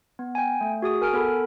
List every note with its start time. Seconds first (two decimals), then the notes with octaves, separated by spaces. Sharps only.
0.19 B3
0.35 G5 G#5
0.61 A3
0.82 F#4 G#4 D#6
1.01 A#4 G#5 F6 D7
1.13 B3 A4 A#4 B5